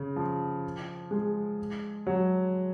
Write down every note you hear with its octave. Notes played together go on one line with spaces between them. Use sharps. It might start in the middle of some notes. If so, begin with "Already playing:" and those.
Already playing: C#3
F3
G#3
F#3